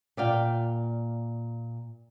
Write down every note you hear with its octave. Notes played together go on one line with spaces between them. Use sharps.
A#2 D5 F5 G5